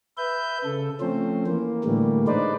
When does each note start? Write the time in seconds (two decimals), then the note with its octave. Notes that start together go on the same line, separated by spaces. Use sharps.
0.17 B4 E5 G6
0.65 C#3 A4
1.00 F3 A3 C4 C#4 C5
1.47 E3 A#3
1.84 A2 D3 E3 G3 A3 A#3
2.27 G#3 D4 D#4 B4 C5 D5